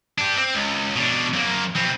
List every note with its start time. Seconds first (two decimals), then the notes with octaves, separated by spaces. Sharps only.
0.18 D4 G4
0.36 C4
0.55 C#2
0.96 B2 D4
1.33 F#2 A#3
1.76 B2 C4